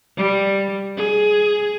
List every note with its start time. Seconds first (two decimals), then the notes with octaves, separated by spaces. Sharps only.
0.17 G3
0.97 G#4